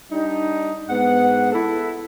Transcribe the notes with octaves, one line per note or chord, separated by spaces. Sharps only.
G3 D4 D#4
G#2 B3 F#5
E4 A4